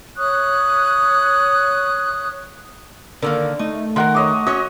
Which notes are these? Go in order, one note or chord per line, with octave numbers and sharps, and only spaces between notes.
C#5 C#6 D#6 F#6
D3 D#3 A#3 A#4
A3 D#4
D#3 A#4 F#5 C6
C#5 D#5 D6
C#4 F#4 C#5 D#5